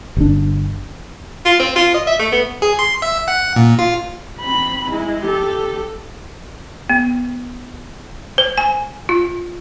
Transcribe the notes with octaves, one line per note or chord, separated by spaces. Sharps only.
G1 D4
F4
C4
F4
D#5
E5
A3
B3
G#4
C6
E5
F#5
A#2
F4
C4 B5
G#3 E4
G4 A4
B3
C5
G#5
F4